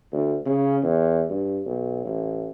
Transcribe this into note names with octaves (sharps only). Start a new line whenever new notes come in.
D2
C#3
E2
G2
B1
A1